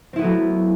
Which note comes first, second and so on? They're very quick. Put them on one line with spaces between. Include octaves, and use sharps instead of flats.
C4 E4 B3 A3 F#3